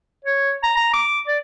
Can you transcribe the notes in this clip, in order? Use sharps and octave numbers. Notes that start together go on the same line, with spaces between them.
C#5
A#5
A#5
D6
D5